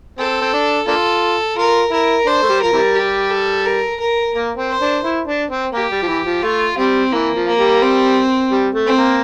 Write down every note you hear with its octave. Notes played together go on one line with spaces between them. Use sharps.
C4 A4
C4
D4
A#3 D4 F4 A4
F4 A#4
E4 A#4
D4 C5
A3
G3
F3 A#4
C3 E3 G3
G4
A4
A#4
A#4
A#3
C4
C5
D4
E4
D4
C4
A#3 G4
G3
F3
E3
F3
A3 F4
G3 C4
E3 A#3
F3
A#3
G3
C4
G3
A3
C4
A#3